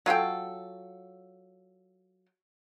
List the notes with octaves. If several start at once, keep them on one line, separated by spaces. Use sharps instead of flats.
F#3 F4 A4 G5